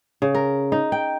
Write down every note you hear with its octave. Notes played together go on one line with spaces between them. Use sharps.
C#3
A#4
D#4
G5